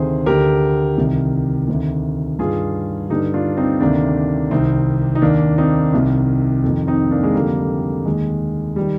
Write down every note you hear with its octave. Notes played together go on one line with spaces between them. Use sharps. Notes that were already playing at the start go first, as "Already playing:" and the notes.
Already playing: D2 C3 D#3 G#4 C5
D2 D3 G4 A#4
C2 C3 D#3
D2 C3 D#3
G2 D#3 F4 G#4
G2 D3 D#4 G4
D4 F4
C4 D#4
D2 C3 D#3 A#3 D4
C2 C3 D#3 C4 D#4
D#4
D#2 D#3 A#3 D4
C4 D#4
C2 C3 D#3
F2
D#3
C4 D#4
A#3 D4
G#3
F2 D3 G3 A#3
D#2 D#3 G#3
D#3 G3